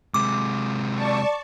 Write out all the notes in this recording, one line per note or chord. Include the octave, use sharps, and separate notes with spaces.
C3 G#3 D6
D5 A5 C#6